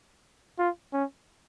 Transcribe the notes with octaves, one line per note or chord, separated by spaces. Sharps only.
F4
C#4